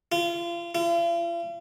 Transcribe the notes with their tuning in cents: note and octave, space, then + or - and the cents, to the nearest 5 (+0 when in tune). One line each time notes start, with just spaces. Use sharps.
F4 -30
F4 -45